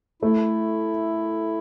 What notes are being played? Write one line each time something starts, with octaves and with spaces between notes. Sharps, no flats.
A3 E4